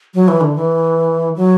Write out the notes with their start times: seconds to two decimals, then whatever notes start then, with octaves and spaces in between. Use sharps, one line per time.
0.14 F#3
0.28 E3
0.41 D3
0.56 E3
1.36 F#3